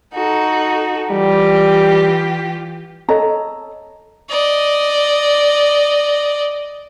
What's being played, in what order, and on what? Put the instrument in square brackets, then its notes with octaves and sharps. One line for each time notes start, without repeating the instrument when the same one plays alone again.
[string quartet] D#4 F#4 A4
[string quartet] E3 F4 G4 [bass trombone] G3
[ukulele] A4 C#5 D#5 A#5
[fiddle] D5 D#5